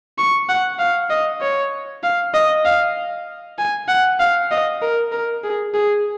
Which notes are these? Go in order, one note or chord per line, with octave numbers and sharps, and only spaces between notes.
C#6
F#5
F5
D#5
C#5
F5
D#5
F5
G#5
F#5
F5
D#5
A#4
A#4
G#4
G#4